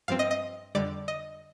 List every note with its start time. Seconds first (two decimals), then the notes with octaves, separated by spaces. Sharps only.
0.08 G2 F3 C4 F5
0.19 D#5
0.31 D#5
0.75 F2 D3 G3 D5
1.08 D#5